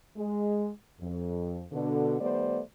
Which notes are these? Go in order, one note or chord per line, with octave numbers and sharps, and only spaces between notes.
G#3
F2
B2 D3
D#3 G3 A3 B3 C5 D5